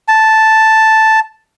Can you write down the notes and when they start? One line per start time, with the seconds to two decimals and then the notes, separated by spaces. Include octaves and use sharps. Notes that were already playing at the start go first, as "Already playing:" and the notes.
0.08 A5